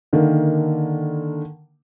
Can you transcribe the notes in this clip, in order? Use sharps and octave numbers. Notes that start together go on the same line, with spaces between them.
D3 D#3 A#3